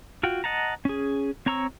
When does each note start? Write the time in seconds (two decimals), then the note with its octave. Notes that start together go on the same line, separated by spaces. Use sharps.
0.23 F4 F#4 G5
0.44 D#5 F#5 A5 A#5
0.85 C#4 G#4
1.46 C4 C#5 A#5 C#6 E6